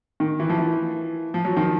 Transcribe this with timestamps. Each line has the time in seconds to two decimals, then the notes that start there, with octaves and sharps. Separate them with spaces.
0.20 D#3
0.40 E3
0.49 F3
0.58 E3
1.34 F3
1.45 F#3
1.56 D#3 F3